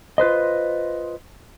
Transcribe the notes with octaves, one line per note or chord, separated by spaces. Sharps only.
F4 B4 C5 D#5